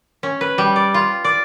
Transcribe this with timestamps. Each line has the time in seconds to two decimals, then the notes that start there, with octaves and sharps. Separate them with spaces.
0.23 C#4
0.41 B4
0.58 G3
0.76 D5
0.94 F4
1.24 D5